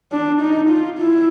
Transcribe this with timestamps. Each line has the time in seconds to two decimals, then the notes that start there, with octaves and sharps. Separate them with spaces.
0.12 D4
0.41 D#4
0.69 F4
0.98 E4